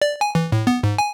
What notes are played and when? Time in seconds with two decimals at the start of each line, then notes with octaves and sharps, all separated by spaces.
0.02 D5
0.21 G#5
0.35 E3
0.52 A2
0.67 B3
0.83 G#2
0.98 G#5